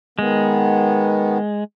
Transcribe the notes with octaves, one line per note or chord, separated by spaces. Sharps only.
D#3 G#3 B3